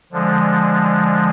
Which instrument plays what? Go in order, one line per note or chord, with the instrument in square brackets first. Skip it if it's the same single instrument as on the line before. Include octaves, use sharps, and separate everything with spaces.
[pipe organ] D3 F3 G#3